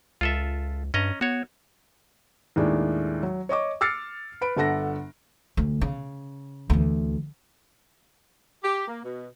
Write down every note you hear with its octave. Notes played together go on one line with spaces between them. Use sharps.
C#2 F4 A4 E5
G2 C#4 D#5 A#5
B3 F#4 C#5
D#2 A2 G#3 D4
F#3
C#5 D#5 C#6 D6
D6 E6 F6 A6 C7 C#7
B4 B5 D7
G1 D3 A4 F#5 A#6
D2
C#3
D2 E3
G4
A#3
B2